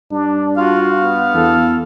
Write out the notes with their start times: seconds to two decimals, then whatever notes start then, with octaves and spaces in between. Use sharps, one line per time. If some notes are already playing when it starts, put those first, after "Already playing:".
0.11 G2 D4
0.57 F4 F#4 F5
1.02 B3
1.34 E2 A4